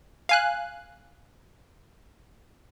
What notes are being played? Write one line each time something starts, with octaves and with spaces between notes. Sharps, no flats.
F5 G#5 F#6